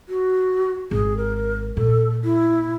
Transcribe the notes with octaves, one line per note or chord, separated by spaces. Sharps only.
F#4
G#1 G#4
A#4
A#2 A4
E4